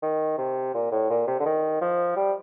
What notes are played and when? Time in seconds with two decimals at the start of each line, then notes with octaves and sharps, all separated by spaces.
0.02 D#3
0.38 C3
0.74 A#2
0.91 A2
1.10 A#2
1.27 C3
1.40 D3
1.45 D#3
1.81 F3
2.16 G3